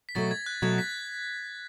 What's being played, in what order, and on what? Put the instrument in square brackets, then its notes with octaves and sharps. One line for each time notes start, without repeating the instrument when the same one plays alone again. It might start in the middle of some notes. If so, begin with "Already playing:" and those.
[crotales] B6
[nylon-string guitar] B2 F#3 A3 [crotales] A6
[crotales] G#6
F#6
[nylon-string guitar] B2 F#3 A3 [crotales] G#6
[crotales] B6